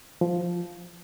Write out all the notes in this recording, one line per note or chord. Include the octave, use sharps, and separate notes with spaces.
F3